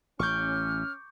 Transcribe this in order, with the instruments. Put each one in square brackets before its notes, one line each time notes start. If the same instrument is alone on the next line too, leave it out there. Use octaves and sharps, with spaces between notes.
[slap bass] A1 [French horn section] C#4 [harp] C#6 D6 G6 [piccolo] F6